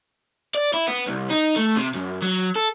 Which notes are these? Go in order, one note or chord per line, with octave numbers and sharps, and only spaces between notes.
D5
E4
B3
C2
D#4
A3
C3
F#2
F#3
A4